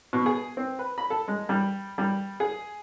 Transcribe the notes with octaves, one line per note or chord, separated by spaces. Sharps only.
B2
G#4
C4
B4
B5
A4
G#3
G3
G3
G#4